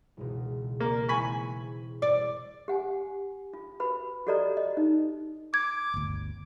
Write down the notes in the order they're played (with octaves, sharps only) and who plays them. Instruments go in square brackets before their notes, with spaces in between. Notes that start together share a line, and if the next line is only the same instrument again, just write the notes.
[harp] E1 C#2 B2
[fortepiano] A#3
[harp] C4 E4 [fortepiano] G#5 B5 C#6
[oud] D5
[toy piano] G4 F#5 G#5
F4
F#4 B4 B5
F#4 G4 A4 D5 D#5 A#5
D#5
D#4
[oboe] D6 [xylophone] G#6
[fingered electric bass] G1 D2